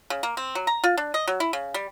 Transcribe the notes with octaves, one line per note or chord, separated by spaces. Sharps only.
C#3
A#3
C4
F#3
A#5
F4
D4
D#5
F#3
E4
C#3
G3